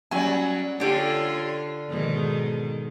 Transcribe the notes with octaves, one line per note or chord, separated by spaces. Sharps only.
F#3 G3 C#4 G#5
D3 D4 F4 G4 C#5
G#2 B2 D#3